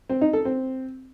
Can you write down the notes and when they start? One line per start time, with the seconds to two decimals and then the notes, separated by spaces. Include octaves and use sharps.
0.09 C4
0.21 D#4
0.33 A4
0.45 C4